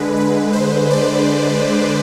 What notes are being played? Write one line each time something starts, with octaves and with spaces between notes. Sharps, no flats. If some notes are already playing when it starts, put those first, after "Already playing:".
Already playing: D3 G#3 B4
B4
C5
D5